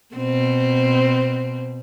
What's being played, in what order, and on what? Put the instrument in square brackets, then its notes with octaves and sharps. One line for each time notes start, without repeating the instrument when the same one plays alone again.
[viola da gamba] B2 C4